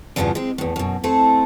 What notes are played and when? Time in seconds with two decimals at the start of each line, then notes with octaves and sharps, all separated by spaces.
0.16 E2 G2 C#3 E3 F3 B3
0.35 G#3 C4
0.58 E2 A2
0.76 F#2 B2
1.04 A3 C4 E4 A4